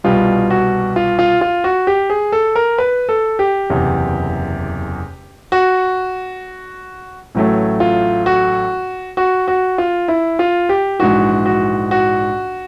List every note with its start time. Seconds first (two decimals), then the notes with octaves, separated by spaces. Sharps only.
0.04 C2 B2 G3 F4
0.50 F#4
0.96 F4
1.19 F4
1.41 F4
1.64 F#4
1.87 G4
2.10 G#4
2.32 A4
2.55 A#4
2.78 B4
3.09 A4
3.39 G4
3.70 F#1 E2 C3
5.52 F#4
7.35 A1 A2 F#3 A3
7.80 F4
8.26 F#4
9.17 F#4
9.48 F#4
9.78 F4
10.08 E4
10.39 F4
10.69 G4
10.99 A#1 G#2 E3 F#4
11.46 F#4
11.91 F#4